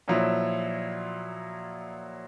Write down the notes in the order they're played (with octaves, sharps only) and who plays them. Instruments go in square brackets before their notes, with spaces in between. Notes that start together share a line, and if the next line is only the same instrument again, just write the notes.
[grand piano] A#2 F3 F#3 E4